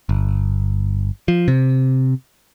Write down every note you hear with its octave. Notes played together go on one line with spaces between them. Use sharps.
G1
F3
C3